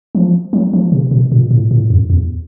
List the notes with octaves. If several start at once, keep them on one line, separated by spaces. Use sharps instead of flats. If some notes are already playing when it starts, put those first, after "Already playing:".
F3
F#3
F3
C3
B2
A#2
A2
A2
F2
E2